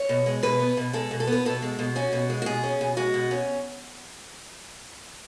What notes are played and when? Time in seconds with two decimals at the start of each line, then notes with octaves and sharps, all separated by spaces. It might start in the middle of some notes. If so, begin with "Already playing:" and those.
Already playing: C#5
0.09 B2
0.26 G#3
0.43 B2 B4
0.60 B3
0.77 B2
0.93 G#3 A4
1.11 B2
1.20 A4
1.27 B3
1.32 B4
1.45 B2 A4
1.62 G#3
1.79 B2
1.96 C#4 F#4
2.13 B2
2.30 G#3
2.42 F#4
2.46 B2 G#4
2.64 C#4
2.81 B2
2.97 G#3 F#4
3.14 B2
3.31 C#4